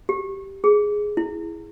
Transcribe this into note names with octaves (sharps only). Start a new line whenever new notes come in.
G4
G#4
E4